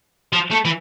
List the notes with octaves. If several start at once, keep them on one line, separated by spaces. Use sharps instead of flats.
F3
A3
E3